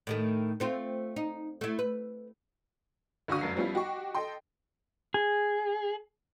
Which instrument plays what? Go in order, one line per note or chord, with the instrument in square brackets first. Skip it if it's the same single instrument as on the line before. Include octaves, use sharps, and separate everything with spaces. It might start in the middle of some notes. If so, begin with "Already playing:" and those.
[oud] A2 D#3 A3
A3 C4 F4
D#4
A3 E4
B4
[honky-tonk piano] C#2 D3 F#4 C#6 D#6
F1 F#2 F#3 C7
F3 G3 B3 C#4 E4 F4
D#4 F#4 G4 C#6
A4 D#5 G5 C6
[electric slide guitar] G#4